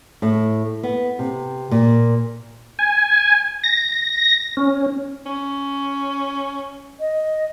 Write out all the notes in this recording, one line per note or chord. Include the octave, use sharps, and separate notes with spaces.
A2
B3
C3
A#2
G#5
A#6
C#4
C#4
D#5